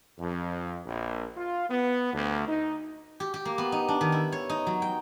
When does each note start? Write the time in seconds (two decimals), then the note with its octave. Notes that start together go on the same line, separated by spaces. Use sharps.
0.19 F2
0.85 A#1
1.37 F4
1.70 B3
2.14 D2
2.48 D#4
3.20 G4
3.34 G4
3.45 A#3
3.58 B3
3.72 D#4
3.88 D4
4.01 D#3
4.12 E4
4.32 C#5
4.50 D#4
4.67 F#3
4.82 G5